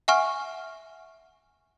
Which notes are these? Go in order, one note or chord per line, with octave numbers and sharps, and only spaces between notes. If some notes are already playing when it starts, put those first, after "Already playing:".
E5 F#5 G#5 C#6 F6